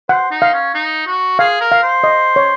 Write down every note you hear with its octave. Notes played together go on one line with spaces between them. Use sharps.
C5 F#5
D#4
F5
C#4
D#4
F#4
G#4 F5
A#4
F5
C5
D#5
C#5